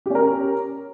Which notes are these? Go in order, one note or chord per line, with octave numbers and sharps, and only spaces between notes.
C#4 G4 A#4